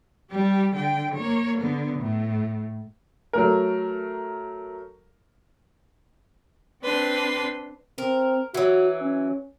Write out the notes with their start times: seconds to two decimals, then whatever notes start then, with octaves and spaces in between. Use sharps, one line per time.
0.31 G3 G4
0.76 D3 G5
1.15 A#3 C#5
1.58 D3 B3
1.99 A2
3.33 F#3 A3 A#4
6.83 C4 D4 B4 C6
7.98 C4 A#4
8.54 E3 F#3 F#4
9.01 C#4